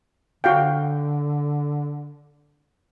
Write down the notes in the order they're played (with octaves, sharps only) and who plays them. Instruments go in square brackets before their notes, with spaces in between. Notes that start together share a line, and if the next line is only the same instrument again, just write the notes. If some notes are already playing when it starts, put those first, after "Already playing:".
[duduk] D3 [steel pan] F#4 F5 G5